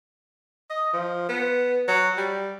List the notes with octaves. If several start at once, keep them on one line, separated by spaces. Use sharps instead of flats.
D#5
F3
B3
F#3
G3